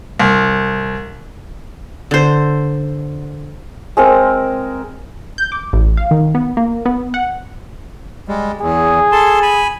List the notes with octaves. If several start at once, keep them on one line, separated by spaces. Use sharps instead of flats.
C2
D3 C5
G#3 C4 A#4
G6
D6
A1
F5
D#3
B3
A#3
B3
F#5
G3 G#3
E2 G#4
A4 A5 C6
G#5 B5